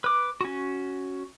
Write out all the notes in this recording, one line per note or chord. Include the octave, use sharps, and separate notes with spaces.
B4 D6
C#4 F#4